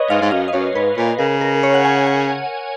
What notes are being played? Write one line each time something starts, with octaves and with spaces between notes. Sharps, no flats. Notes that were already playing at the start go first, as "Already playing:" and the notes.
Already playing: B4 C#5 D#5
G#2 F5
G#2
F#2 F5
D#5
F#2 C#5
G#2 B4
A#2 B4
C#3 A#4
A#4
C#5
F#5
G#5
G#5